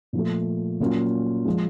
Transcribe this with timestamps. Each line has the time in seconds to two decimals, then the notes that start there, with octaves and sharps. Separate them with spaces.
0.13 A#2 F3 A3
0.80 A#2 F#3 A#3 C#4 F4
1.45 F3 G#3